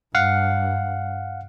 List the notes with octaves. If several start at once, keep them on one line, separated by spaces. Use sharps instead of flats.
G2 F5 F#5